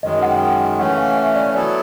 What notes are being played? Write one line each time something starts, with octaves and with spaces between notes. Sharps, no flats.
F#2 D#3 G#3 D#5
F#5
G5
E3 A3 C#4 F#5
F5
E5
D5
F#3 B3 E4 A4 D5